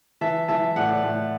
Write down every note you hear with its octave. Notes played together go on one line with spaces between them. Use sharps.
E3 E5 A5
E3 E5 A5
A2 D5 F#5
A2